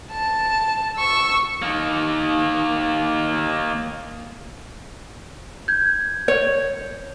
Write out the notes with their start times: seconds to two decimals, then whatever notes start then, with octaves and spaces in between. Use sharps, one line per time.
0.12 A5
0.97 C#6 E6
1.62 D#3 A#3
5.68 G6 G#6
6.28 C#5